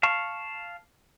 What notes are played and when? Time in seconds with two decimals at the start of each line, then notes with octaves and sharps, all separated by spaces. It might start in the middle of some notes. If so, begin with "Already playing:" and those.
0.03 F5 A5 C#6